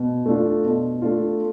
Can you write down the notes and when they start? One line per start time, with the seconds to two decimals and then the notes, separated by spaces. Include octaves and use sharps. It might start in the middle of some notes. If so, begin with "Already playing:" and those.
Already playing: B2
0.26 A3 D4 F4
0.64 B2
1.02 A3 D4 F4